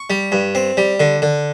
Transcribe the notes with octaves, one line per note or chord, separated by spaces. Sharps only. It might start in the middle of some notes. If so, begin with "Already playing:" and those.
Already playing: C#6
G3
G2
C4
G3
D3
D3